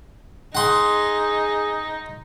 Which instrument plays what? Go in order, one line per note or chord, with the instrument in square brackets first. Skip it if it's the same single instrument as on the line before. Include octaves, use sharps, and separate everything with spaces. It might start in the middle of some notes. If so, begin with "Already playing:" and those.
[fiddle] D#4 [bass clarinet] G#4 [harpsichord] F#5 C6